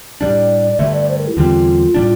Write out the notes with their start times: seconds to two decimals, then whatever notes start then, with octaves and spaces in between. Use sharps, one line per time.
0.21 A2 G3 D4 D5
0.79 G2 D3 A3 E5
0.93 D5
1.08 C5
1.18 A#4
1.28 E4
1.37 E2 D3 G3 C4 F4
1.94 A2 G3 D4